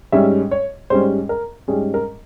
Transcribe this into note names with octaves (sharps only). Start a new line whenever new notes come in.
G#2 G3 C#4 E5
C#5
G#2 G3 C#4 C5
A#4
G#2 G3 C#4 G#4
A#4